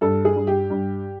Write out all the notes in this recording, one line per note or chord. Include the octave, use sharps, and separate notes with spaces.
G2 A4
G#4
G2
G4
G2